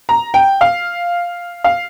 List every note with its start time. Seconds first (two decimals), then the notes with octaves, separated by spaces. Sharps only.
0.09 A#5
0.34 G5
0.61 F5
1.64 F5